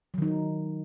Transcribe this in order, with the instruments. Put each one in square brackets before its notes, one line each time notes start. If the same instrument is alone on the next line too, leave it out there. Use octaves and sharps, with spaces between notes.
[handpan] F#3
D#3
D#4